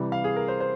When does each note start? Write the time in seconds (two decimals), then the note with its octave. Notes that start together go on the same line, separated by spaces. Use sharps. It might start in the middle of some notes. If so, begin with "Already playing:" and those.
Already playing: C3 E3 G3
0.12 F5
0.24 G#4
0.36 A#4
0.48 C5
0.60 C5